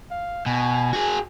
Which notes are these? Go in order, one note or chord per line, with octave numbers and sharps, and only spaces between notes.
F5
B2 G#5
F#4 G#4